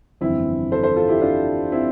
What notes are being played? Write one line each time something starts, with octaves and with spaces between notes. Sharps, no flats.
G1 F2 E3 C4 E4
A4 C5
A4 C5
F4 A4
E4 G4
D4 F4
C4 E4